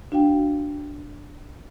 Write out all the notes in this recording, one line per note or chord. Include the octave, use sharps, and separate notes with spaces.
D4 F#4 F5 G5